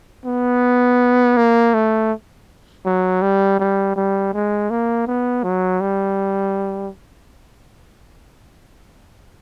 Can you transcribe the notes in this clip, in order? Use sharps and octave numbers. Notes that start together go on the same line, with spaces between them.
B3
A#3
A3
F#3
G3
G3
G3
G#3
A#3
B3
F#3
G3